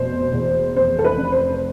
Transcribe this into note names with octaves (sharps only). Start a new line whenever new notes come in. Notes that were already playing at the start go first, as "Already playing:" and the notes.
Already playing: F1 B2 C5
E2
F1 C5
A4
B4
F1
C5